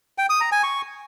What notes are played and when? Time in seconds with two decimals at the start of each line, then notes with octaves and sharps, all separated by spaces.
0.18 G5
0.30 D#6
0.41 A#5
0.52 G#5
0.63 C#6